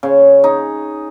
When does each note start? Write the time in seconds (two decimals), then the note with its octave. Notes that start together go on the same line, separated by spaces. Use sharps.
0.03 C#3
0.44 D#4